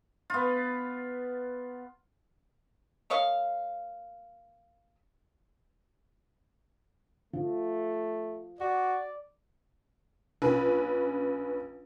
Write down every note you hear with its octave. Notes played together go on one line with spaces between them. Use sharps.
B3 F4
A#3 C#5 D#5 F5
F3 A3
F#4 D5
A#1 C#4 B4